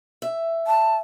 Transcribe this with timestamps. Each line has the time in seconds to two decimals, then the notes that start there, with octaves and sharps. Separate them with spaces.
0.22 E5
0.67 A5